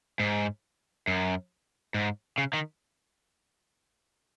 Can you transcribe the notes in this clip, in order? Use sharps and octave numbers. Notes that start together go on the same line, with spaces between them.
G#2
F#2
G#2
C#3
D#3